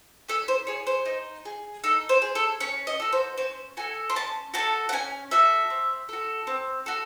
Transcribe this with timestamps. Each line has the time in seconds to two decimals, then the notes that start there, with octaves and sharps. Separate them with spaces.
0.28 C#4 A4
0.48 C5
0.67 G#4 C#5
0.87 C5
1.06 D#4
1.45 G#4
1.84 D#4 A4
2.09 C5
2.22 G#4
2.35 A4
2.60 C#4 C#5
2.87 D#5
3.00 F#4 A4
3.13 C5
3.38 C#4 C5
3.77 F#4 A4 G#5
4.10 C6
4.16 C#4 A5
4.54 F#4 A4 A5
4.89 F#5
4.93 C#4 G#5
5.31 F#4 A4 E5
5.70 C4
6.09 F#4 A4
6.47 C4
6.86 F#4 A4